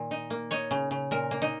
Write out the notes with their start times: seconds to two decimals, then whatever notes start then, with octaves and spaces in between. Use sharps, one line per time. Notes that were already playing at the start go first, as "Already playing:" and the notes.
Already playing: A#2 D#3
0.11 D#4
0.30 A#3
0.51 D#4 C#5
0.71 C#3
0.91 C#3
1.11 A#2 A#4
1.31 A#3
1.42 D#4